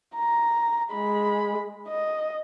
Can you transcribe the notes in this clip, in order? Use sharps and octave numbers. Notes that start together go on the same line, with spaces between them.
A#5
G#3 B5
D#5